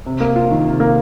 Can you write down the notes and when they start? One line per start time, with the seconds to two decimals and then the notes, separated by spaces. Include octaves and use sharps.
0.06 C3
0.20 A#3
0.36 F4
0.51 D#3
0.65 C3
0.80 A#3